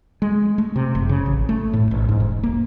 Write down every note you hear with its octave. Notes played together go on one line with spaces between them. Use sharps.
G#3
A3
C3
F#1
C#3
A1
A3
A2
A1
G#2
E1
A#3